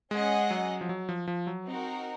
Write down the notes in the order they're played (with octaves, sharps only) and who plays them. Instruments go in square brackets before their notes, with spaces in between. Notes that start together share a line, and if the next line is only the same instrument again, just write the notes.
[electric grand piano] G#3 [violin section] C#4 G#4 D#5 F#5
[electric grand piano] F#3
F3
F#3
F3
F3
F#3
[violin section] C4 D#4 F#4 A#4